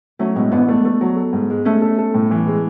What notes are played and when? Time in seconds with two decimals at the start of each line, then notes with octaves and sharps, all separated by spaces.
0.19 F#3 A3 C#4
0.36 A2 G#3 B3
0.51 A1 B3 D4
0.68 A3
0.85 A3
1.01 F#3
1.16 A4
1.33 G#2
1.50 G#3
1.65 A3 C#4 A4
1.82 A4
1.98 A4
2.14 A2
2.31 E3
2.47 G#3